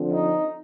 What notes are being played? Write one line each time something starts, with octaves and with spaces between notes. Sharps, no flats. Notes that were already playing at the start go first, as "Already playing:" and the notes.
Already playing: D3 F3 C4
D#4